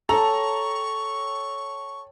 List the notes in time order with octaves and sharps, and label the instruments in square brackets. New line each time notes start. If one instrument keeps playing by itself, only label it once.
[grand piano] A4 [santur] C#5 G5 A5 [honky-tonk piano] A#5 [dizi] C#6